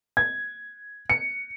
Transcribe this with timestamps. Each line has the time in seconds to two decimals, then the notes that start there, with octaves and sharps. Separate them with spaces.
0.17 G#6
1.10 C#7